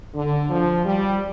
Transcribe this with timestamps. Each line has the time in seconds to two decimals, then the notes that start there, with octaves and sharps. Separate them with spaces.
0.14 D3
0.49 F3
0.85 G3